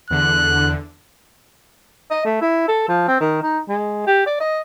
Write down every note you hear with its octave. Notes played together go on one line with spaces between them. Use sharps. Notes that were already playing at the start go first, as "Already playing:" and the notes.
E2 D3 F#6
D#5
A3
E4
A4
F3
C4
D#3
D#4
G#3
G4
D5
D#5